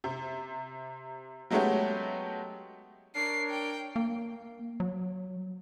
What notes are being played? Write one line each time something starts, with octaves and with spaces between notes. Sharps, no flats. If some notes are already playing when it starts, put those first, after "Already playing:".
C3
F#3 G#3 A3 B3 C#4 G4
D4 A#4 C#5 C7
G5
A#3
F#3